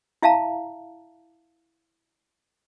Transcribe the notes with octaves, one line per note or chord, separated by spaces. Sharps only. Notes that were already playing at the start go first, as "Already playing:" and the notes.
E4 E5 F5 A5 A#5